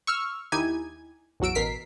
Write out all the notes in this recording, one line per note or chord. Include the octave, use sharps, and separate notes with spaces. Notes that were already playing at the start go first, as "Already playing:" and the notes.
C#6 E6 F6
D#2 D#4 E4 G4 G#5 G#6
A1 E2 F#3 F#4 E6 D7
A1 B2 A#4 B6 C7